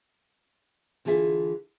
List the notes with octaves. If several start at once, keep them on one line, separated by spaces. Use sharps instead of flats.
D3 E3 F4 G#4 E5